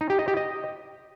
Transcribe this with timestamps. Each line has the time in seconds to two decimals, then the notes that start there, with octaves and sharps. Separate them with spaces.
0.01 D#4
0.10 G4
0.19 D#5
0.28 G4
0.37 D#5